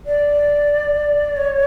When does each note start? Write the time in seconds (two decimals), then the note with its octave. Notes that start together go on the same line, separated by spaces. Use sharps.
0.06 D5
1.37 C#5